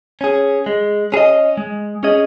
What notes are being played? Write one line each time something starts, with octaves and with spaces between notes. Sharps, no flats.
C#4 G#4
G#3
C#4 G#4 D#5
G#3
C#4 G#4 D#5